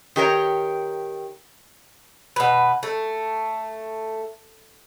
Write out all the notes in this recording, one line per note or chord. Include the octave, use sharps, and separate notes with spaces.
D#3 G4 A#4 C#5
B2 B4
A3